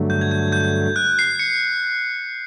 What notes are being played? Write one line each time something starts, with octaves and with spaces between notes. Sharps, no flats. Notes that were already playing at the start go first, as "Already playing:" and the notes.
Already playing: G2 D3 F#3 A3
G6
G#6
G6
G6
F#6
C7
C#7